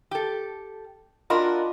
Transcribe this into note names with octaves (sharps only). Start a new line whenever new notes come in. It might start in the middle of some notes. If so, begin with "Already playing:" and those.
G4 A4
D4 F4 F#4 A#4 D#5 B5